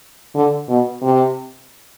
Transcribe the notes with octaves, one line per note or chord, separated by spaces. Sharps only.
D3
B2
C3